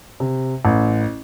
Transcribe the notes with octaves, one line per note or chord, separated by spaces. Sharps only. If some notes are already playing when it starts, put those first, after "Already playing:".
C3
A1